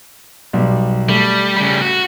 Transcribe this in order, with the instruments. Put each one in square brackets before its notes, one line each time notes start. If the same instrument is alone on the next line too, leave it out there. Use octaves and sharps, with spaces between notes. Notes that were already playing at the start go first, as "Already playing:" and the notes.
[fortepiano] B1 G3
[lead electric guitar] G3 [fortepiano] A3
[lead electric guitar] C#3 G3
F#4